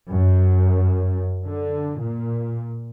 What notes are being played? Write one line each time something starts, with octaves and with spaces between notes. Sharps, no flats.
F#2
D3
A#2